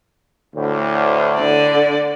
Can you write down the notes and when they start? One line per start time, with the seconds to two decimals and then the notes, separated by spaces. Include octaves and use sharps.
0.55 D2 A2
1.36 D3 D5